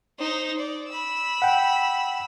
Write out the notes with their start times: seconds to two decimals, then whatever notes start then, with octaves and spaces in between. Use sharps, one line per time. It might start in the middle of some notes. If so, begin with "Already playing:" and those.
0.19 D#4 C5
0.58 D5
0.89 B5 E6
1.42 F#5 G5